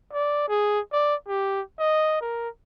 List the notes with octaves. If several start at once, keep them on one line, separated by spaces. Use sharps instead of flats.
D5
G#4
D5
G4
D#5
A#4